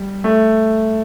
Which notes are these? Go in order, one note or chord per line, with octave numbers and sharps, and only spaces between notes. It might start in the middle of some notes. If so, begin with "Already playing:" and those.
Already playing: G3
A3